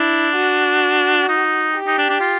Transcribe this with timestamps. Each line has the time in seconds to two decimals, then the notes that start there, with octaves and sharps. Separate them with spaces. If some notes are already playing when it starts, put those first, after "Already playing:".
Already playing: D4 E4
0.35 F#4
1.28 D#4
1.75 G4
1.87 D#4
1.98 D4
2.09 D4
2.21 F4